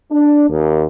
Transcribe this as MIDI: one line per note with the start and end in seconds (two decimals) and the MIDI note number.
0.11 0.45 62
0.49 0.84 39